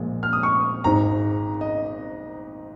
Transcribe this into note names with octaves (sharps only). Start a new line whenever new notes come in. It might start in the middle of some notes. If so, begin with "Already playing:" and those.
Already playing: A#1 A#2 G#3
F6
D#6
C#6
G#1 G#2 G#3 A#5
D#5